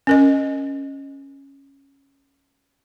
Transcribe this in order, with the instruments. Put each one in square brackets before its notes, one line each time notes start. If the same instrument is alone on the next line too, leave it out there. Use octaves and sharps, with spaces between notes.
[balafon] C#4 A#4 D#5